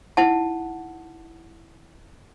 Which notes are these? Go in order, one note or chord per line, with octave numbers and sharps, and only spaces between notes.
D#4 E4 F#5 A5